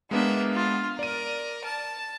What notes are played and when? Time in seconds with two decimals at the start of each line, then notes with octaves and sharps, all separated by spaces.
0.11 G#3 A#3 B3 D4 E5
0.54 F4
0.99 A#4 D5 D#7
1.64 A5